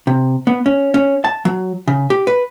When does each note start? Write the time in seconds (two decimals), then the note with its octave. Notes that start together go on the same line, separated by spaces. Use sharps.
0.07 C3
0.47 B3
0.66 C#4
0.94 C#4
1.24 A5
1.45 F#3
1.88 C#3
2.10 G4
2.27 B4